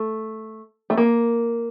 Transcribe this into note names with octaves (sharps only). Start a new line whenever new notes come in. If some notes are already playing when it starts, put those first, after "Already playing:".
Already playing: A3
A3
A#3